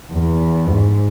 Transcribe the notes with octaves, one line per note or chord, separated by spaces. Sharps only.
E2
G#2